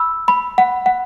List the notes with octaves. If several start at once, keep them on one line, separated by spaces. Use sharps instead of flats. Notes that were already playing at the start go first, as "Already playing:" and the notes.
Already playing: B5 E6
B5
F#5
F#5